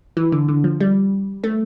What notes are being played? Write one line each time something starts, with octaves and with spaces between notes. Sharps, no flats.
E3
D3
D3
F3
G3
A3